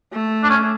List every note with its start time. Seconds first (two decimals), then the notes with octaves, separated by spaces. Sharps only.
0.12 A3
0.43 D4
0.50 C#4